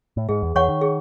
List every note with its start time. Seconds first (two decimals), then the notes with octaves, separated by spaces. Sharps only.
0.17 A2
0.29 G#2 G#4
0.43 E2
0.55 E2 C#5 F#5 C#6
0.69 D#3
0.81 G#4